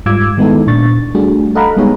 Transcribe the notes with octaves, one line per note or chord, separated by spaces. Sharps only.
G#2 G3 F4 D6 E6 G#6
D#3 G#3 B3 D#4 E4 A4
A#2 D4 C#6 A6
G3 A3 D4 F#4 G#4
A4 D#5 F5 F#5 A#5 B5
G3 G#3 B3 D#4 G#4 C#5